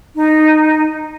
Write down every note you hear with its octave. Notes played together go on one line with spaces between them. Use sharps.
D#4